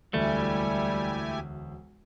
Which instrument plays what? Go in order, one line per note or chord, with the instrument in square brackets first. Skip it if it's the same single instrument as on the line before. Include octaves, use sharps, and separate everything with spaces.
[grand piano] E1 D2 E5 [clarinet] G3 [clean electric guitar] A3 [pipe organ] E4 G4 G#5